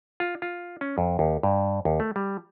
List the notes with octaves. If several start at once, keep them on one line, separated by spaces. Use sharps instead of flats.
F4
F4
C#4
F2
D#2
G2
D#2
A3
G3